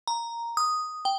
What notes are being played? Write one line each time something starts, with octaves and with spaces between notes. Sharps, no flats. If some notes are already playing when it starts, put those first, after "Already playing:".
A#5
D#6
G5